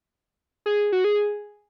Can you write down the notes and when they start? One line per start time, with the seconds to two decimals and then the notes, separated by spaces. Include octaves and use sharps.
0.66 G#4
0.92 F#4
1.04 G#4